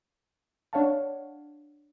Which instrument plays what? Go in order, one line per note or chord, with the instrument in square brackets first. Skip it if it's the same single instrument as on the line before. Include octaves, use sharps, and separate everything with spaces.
[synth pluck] D4 C#5 F5 F#5 A5